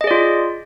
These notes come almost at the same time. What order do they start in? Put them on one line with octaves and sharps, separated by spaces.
D#5 G#4 D5 F4